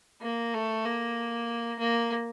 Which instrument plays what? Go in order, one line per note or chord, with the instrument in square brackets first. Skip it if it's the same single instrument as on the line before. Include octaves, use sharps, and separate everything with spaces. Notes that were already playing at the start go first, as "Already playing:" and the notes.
[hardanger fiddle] A#3
A3
A#3
A#3